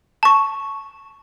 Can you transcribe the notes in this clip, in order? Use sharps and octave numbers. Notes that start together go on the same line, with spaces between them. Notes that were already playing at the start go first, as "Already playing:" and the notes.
A5 C#6